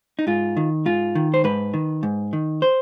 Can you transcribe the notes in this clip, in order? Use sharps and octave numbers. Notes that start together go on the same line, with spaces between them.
D#4
G#2 F4
D#3
G#2 F4
D#3
C5
G#2 B4
D#3
G#2
D#3
C5